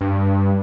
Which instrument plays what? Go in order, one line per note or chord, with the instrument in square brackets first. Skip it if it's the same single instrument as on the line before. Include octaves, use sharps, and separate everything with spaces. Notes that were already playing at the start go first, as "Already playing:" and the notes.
[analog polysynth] G2